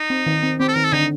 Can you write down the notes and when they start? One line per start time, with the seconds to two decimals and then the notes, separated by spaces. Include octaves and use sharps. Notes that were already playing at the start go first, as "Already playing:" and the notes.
Already playing: D#4
0.10 C4
0.26 D#3
0.43 C4
0.60 C4 G4
0.68 A4
0.76 D#3 A#4
0.84 A4
0.92 D3 D#4